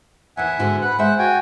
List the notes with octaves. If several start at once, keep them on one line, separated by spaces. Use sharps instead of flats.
D#2 E3 E5 F#5 G#5
G#2 D3 F#4
B4 F#5 B5
G#3 C5 E5 F#5
F#4 G5 G#5